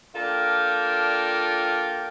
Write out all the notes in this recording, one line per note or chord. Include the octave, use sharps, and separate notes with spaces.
A#3 D4 F4 A4 A#4 G5